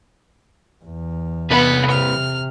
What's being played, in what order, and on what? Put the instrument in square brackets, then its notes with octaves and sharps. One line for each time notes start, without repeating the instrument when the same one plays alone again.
[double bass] E2
[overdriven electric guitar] C2 B4 [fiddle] B3
[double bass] C3 [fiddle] F6